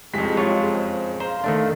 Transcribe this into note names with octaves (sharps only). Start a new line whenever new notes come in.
F#1 F2 G3 G#3 G#4 B6
F4 C#5
C5
C5 F5 A#5
D#3 A3 D4